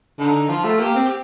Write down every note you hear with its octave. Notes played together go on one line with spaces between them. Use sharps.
D3 D#4
F3 F4
A3
A#3 G4
C4